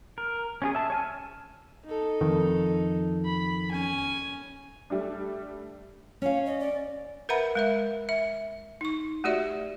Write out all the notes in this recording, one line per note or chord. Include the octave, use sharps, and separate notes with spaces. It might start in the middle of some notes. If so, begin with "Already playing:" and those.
A#4
C#4 F4 G#4
E5 A5
C#5 G#5 F6
D#4 A4
F2 D#3
B5
C#4 G#5
G3 A3 D4
C#4 C#5 F5
D#5
D5
A#4 B4 E5 F#5 A#5 B5
G#3 A#4 E5
E5
D#4 C#6
A3 F#4 G4 D5 E5